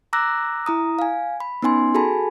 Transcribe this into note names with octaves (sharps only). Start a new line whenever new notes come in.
A#5 D6 E6 F#6 A#6
E4 A#5 D#6
F5 G#5
B5
B3 C#4 D#4 G#5 C6
F#4 G#4 A4 G#5 A5 B5